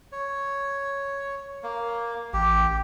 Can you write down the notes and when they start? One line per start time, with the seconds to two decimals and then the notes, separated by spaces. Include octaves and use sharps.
0.12 C#5
1.63 A#3
2.33 A1 G4